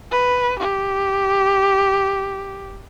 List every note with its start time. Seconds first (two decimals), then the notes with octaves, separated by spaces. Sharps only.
0.11 B4
0.59 G4